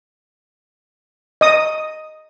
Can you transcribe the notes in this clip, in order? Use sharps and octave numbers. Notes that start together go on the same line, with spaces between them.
D#5 D#6